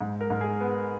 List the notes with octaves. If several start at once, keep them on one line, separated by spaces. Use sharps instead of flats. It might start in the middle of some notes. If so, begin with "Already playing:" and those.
G#2
A#4
G#2
G#4
B3